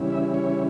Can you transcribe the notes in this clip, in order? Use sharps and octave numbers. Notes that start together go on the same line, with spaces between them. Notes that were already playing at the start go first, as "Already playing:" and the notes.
Already playing: C#3 E3 G3 C#4 E4
E5
C#5